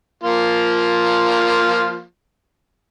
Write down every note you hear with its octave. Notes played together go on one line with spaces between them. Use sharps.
F3 A#3 F4